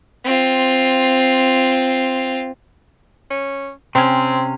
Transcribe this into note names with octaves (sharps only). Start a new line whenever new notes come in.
C4 F4
C#4
C3 C4 C#4